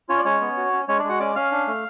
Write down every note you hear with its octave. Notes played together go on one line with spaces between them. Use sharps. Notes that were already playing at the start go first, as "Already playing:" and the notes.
C#4 F4 C#5
D5
G#3 C#4 C#5
B3
F#4
C#4
G#3 C#4 C#5
D4 D5
G#3
F#4 F#5
C#4 D5 D6
C#4 F5 F6
D4
A3